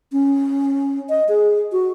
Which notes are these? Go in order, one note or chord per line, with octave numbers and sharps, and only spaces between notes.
C#4
D#5
G#4
F#4